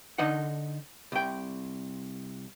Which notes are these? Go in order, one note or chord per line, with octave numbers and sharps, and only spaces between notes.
D3 D#4 F#5
C2 G5